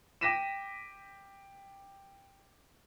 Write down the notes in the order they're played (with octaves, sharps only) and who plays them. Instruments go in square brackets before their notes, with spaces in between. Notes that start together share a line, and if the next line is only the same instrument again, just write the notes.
[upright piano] G5 D6 A#6 B6 D#7 E7